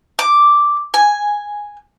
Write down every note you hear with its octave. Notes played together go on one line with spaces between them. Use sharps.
D6
G#5